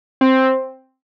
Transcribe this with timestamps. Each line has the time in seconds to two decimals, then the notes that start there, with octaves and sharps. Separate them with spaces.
0.21 C4